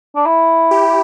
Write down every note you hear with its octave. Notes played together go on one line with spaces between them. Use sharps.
D4
E4
G4